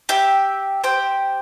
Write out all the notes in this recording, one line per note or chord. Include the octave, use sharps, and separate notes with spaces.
G4 E5 G5
G4 C5 G5